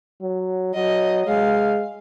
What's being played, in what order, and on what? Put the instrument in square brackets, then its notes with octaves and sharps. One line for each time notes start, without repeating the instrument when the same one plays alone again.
[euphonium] F#3
[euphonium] F#3 [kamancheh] D#5
[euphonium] G#3 [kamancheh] F5